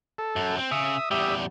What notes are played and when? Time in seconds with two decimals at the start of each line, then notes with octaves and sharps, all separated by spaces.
0.18 A4
0.36 F#2
0.58 C4
0.71 C#3 E5 D#6
1.11 E2 G3 G4 E5 D#6